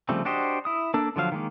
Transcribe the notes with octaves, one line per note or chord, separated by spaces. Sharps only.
C#3 F3 G3 A3 C4
D4 F#4 G4 C5 D#5
E4 D#6
A#3 D4 A4
D3 F3 F#3 F5
D#3 G#3 A#3